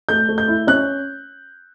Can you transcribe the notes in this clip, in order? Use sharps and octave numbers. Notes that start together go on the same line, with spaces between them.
A3 G6
A3
G6
E4
C#4 F#6